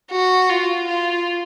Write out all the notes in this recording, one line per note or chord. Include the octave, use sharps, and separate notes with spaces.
F#4
F4
F4